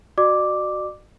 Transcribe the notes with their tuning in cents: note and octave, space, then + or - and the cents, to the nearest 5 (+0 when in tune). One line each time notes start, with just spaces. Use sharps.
F#4 +0 D5 +40 D6 +0